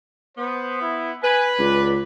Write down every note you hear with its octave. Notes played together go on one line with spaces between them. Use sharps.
B3 C5
E4
B4 G#5
C#2 D5